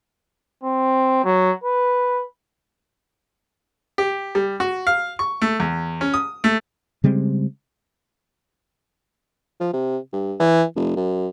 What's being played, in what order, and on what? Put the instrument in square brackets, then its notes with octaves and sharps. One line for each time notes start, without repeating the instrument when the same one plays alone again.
[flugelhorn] C4
F#3
B4
[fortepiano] G4
G3
F#4
F5
C#6
A3
E2
C#4
D#6
A3
[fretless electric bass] C#3 G3 G#3 C4
[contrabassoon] F3
C3
G2
E3
F1
F#2